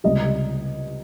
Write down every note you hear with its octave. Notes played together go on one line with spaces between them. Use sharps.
C#2 C3 G3 D#5